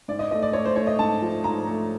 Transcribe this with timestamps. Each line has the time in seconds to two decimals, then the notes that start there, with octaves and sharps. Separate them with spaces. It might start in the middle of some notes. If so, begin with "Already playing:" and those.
0.08 G#2 D5
0.19 D#5
0.31 A3 D#5
0.42 D5
0.53 A3 C#5
0.65 C5
0.76 A3 C#5
0.87 D#5
0.99 G#2 A5
1.22 F3
1.44 G#2 A#5
1.67 A3